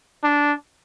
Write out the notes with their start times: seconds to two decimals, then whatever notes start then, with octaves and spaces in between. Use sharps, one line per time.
0.24 D4